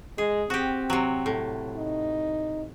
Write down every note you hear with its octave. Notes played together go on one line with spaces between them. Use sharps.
G#3 G#4
C4 F#4 G4
C3 F#3
A2
D#4